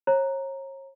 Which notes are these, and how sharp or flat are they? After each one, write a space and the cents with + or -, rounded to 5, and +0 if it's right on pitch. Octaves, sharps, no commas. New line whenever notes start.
C#5 -35 A#5 +0